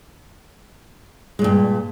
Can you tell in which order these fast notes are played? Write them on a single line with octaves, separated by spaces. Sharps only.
G#3 A#2 G2